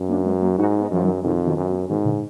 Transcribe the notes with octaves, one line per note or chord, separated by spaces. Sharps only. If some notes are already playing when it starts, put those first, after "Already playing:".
Already playing: F#2
A#3 D4
G#3 B3
F#3 A#3
G#2 D#4 F#4
B3 D#4
F#2 F3
D#3 F#3
F2 B2 D#3
B2 D#3
F#2
B2
G#2 B2 D#3
A#2 D3